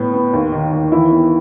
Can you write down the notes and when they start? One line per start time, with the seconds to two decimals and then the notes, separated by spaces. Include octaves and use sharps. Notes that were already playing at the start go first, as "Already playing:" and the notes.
Already playing: A2 B3
0.14 B3
0.33 D#2
0.52 D#3
0.72 D#2
0.92 E3 E4
1.11 B3